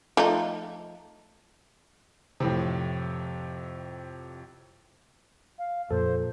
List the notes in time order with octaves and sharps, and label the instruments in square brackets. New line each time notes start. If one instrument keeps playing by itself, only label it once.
[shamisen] F3 A3 D#4
[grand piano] F2 A2 C3
[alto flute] F5
[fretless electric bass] F2 [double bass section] A#2 [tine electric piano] A4 [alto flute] C5